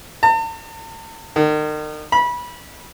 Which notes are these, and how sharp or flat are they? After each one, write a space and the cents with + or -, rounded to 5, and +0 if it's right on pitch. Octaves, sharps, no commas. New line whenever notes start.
A5 +45
D#3 -35
B5 -25